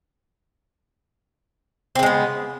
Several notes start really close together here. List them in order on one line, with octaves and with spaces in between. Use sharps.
C4 C#3 G#3 B3